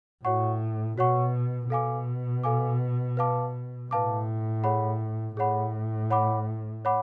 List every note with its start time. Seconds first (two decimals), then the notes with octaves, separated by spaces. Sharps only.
0.24 A2 F#4 C#5 F#5 C#6
0.98 B2 F#4 C#5 F#5 C#6
1.70 B2 A4 F5 G#5 D6
2.44 A4 F5 G#5 D6
3.17 B4 F5 A5 D6
3.91 A2 B4 F5 A5 D6
4.64 G#4 C#5 F#5 B5
5.37 A2 G#4 C#5 F#5 B5
6.10 C#5 F#5 B5 D6
6.85 C#5 F#5 B5 D6